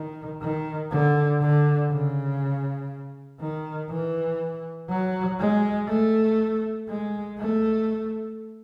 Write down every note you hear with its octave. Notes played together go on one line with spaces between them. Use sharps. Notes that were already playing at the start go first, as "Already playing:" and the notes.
Already playing: D#3
D#3
D3
D3
C#3
D#3
E3
F#3
G#3
A3
G#3
A3